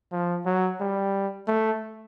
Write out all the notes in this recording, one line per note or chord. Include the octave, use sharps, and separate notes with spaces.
F3
F#3
G3
A3